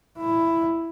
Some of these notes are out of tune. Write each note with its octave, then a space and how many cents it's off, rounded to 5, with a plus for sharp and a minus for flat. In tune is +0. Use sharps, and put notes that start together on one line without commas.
E4 +5